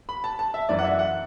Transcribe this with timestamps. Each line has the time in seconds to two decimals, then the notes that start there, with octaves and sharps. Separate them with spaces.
0.09 B5
0.24 A5
0.39 A5
0.54 E5
0.69 F#2 E3 D5
0.79 F#5
0.84 E5
0.99 F#5